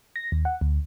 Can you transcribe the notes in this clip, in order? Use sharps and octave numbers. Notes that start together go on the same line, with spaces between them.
A#6
D#2
F#5
D2